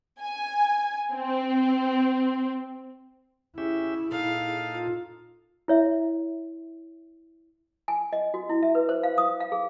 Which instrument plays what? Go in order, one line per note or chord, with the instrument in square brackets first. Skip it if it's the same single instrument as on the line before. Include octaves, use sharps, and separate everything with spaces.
[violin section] G#5
C4
[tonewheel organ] C#4 G4 E5 [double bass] E4 [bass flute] G#4
[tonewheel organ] A#2 D#4 A4 [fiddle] F5
[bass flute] F4
[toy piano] E4 C#5 E5
G#5
D#5
F#4
E4
E5
B4
C5
F5
D#6
F5
G#4